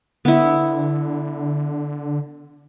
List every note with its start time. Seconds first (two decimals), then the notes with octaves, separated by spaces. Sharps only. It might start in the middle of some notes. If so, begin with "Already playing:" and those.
0.25 D3 B3 E4